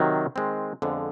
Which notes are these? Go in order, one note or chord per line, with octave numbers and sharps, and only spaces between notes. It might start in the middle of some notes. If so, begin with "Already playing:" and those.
Already playing: C3 D#3 F#3
D#3 G#3 C4
F2 D3 F3 G#3 B3